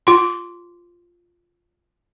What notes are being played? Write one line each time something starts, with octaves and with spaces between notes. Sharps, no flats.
F4 C6